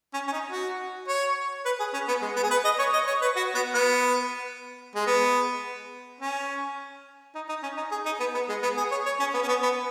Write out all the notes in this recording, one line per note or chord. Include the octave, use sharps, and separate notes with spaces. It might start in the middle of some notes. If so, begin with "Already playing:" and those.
C#4
C#4
D#4
F#4
C#5
B4
G#4
C#4
B3
G#3
B3
G#4
B4
D#5
C#5
D#5
C#5
B4
F#4
B3
B3
G#3
B3
C#4
D#4
D#4
C#4
D#4
G#4
D#4
B3
B3
G#3
B3
G#4
C#5
C#5
C#4
B3
C#4
B3
B3